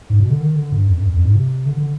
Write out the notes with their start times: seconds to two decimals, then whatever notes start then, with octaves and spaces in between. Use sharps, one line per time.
0.10 G#2
0.20 B2
0.30 D3
0.40 D#3
0.56 D3
0.72 G2
0.87 F2
0.97 G2
1.03 F2
1.13 F2
1.25 G#2
1.35 C3
1.66 D3
1.77 D3